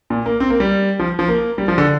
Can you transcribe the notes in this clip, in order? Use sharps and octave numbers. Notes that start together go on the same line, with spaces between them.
A#2
A#3
C4
A#3
G3
F3
F3
A#3
G3
F3
D3